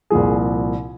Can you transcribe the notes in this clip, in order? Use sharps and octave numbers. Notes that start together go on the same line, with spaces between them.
C2 A#2 F3 G#4